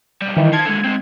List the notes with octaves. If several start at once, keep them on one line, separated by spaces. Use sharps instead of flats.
B1 G3
D#3 E3
C5 A5 G#6
D3 G#3
G#3 C4